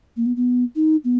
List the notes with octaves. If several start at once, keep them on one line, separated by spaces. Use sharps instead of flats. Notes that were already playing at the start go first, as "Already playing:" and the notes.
A#3
B3
B3
D#4
B3